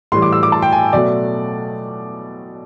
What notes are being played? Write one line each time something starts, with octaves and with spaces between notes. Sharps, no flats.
A2 E3 G3 C6
D6
E6
D6
A5
G5
G#5
B2 F#3 A3 D5